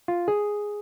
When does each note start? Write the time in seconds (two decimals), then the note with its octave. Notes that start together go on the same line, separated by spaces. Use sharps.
0.08 F4
0.28 G#4